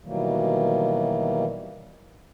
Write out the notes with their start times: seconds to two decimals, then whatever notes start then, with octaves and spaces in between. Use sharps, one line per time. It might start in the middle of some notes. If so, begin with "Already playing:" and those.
0.05 B2 D#3 E3 F#3 G3 A#3